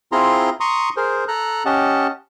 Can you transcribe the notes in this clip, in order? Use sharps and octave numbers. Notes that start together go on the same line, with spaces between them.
C4 E4 F4 G#4 A#5 C6
A#5 C6 C#6 D#6
G#4 A#4 C5
A4 A#5 F#6
C#4 G4 D#5 F#5 A5